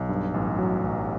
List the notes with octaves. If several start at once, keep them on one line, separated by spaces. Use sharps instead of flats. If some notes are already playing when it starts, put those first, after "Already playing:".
Already playing: B1
G2
A1
F#3
A1